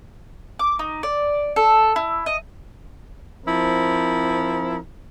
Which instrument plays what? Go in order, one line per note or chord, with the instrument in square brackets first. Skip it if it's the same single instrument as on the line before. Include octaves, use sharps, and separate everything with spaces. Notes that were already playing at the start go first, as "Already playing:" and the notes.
[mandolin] D6
D#4
D5
A4
E4
D#5
[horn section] F3 C4 E4 A#4